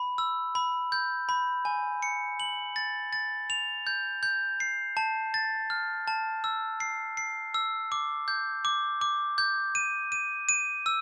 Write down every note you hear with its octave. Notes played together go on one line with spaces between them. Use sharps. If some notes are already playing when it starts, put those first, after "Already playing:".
Already playing: B5
E6
B5
G6
B5
G#5
C#7
F#7
A6
A6
F7
G6
G6
C7
A5
A6
F6
A5
E6
C7
C7
E6
D6
G6
D6
D6
G6
D#7
D#7
D#7
E6